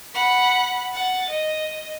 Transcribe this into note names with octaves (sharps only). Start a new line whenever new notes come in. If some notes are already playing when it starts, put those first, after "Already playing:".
F#5 B5
F#5 A6
D#5